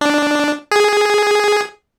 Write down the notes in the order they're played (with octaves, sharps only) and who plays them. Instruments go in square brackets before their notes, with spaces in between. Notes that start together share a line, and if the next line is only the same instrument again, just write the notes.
[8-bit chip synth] D4
G#4